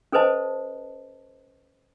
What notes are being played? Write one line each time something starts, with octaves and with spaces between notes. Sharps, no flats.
C#4 A4 B4 C5 D#5 A5